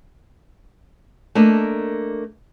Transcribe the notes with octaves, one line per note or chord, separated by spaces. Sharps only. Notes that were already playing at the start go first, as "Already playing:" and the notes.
A3 A#3 D4 A#4 D#5